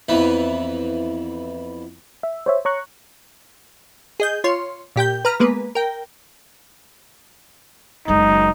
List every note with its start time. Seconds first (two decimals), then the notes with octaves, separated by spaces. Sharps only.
0.09 F2 E3 B3
2.23 E5
2.46 C5 C#5 E5
2.65 C#5 A#5 C#6 F#6
4.20 G#4 D#5 G6
4.44 F4 C#5 C6
4.96 A#2 G4 G5 G6
5.25 B4 A#5 F6
5.40 G#3 A#3 B3 B4
5.75 A#4 G5
8.08 F#1 G#3 D#4